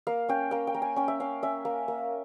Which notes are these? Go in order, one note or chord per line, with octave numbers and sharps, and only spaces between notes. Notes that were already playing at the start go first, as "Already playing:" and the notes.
A#3 F5
C#4 G5
A#3 G5
G5
A#3
G#5
C#4 G5
E5
C#4 F5
C#4 E5
A#3
A#3